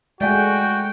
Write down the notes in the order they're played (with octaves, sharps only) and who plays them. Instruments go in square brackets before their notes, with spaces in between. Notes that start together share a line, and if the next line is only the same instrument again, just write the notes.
[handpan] G#3 A3 [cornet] F#4 [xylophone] D5 E5 G#5 [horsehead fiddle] G5